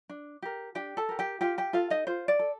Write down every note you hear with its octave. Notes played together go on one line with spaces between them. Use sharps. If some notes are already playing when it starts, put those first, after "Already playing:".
D4
G4 A#4
D4 G4 G5
A4 A5
G4 A#4
G4 G5
F4 G4 G5
G4 G5
F4 A4 F5
D#4 D#5
F4 C5
D5
A4